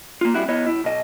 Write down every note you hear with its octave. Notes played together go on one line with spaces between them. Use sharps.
A#3 F4
G3 C4 E4 F#4
B3 E4 C#5 D#5
F#2 E4
B1 D#5